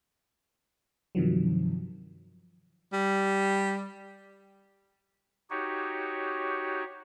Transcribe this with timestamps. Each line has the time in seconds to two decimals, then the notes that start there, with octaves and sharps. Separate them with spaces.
1.15 G2 C3 D#3 F3 F#3
2.93 G3
5.50 D#4 F#4 G4 C#5